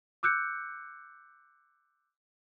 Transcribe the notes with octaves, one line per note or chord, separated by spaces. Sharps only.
D6 E6 F#6 G6 C#7